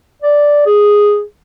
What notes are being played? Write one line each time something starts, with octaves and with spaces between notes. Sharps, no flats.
D5
G#4